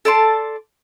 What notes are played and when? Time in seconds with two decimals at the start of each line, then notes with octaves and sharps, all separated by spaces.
0.05 A4 D5 A5 C6